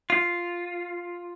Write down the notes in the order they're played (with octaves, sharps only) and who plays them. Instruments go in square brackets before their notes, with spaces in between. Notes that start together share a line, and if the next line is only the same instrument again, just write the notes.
[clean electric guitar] F4